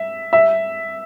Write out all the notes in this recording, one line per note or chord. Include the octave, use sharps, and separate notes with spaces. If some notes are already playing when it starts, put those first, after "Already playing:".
Already playing: E5
E5